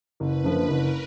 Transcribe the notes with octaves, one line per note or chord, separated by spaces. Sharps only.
F#1 B4
F#2 D3 F3 A#3
F#1 A#4